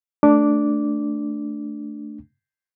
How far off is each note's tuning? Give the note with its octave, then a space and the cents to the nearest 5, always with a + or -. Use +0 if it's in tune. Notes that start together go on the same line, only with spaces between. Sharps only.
A3 +0 D4 +0 D6 -10